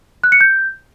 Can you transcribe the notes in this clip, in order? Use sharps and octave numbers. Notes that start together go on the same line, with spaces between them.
F#6
C#7
G6